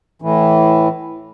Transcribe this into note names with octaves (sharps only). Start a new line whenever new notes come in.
A2 E3